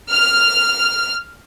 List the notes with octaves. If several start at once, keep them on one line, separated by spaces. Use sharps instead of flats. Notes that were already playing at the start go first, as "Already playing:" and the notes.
F6